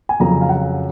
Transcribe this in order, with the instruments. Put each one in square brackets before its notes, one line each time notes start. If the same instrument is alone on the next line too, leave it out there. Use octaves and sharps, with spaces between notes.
[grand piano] G#5
F2 C#3 F#3 A#5
F5
F#5